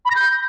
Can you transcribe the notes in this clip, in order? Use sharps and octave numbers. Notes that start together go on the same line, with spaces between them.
B5
A#6
G6